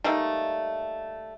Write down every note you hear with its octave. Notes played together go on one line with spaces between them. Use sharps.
G3 A3 A#3 D#4